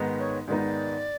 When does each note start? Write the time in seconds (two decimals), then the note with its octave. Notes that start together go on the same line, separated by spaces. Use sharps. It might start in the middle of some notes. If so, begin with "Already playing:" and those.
Already playing: G#2 D#3 G#3 B3 D#4
0.19 C#5
0.47 G#2 D#3 G#3 B3 D#4 D5